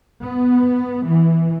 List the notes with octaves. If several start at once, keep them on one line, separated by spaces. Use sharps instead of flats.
B3
E3